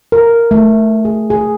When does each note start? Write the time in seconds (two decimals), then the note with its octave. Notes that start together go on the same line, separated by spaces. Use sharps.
0.12 A#4
0.51 A3
1.05 G#4
1.30 G#4